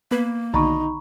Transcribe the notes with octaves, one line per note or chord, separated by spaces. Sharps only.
A#3 B3 B4 G#6
B1 D3 D#3 D#4 A#5 B5 C#6